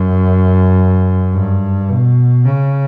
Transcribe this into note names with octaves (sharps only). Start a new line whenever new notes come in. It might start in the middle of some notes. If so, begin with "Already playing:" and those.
Already playing: F#2
G2
B2
C#3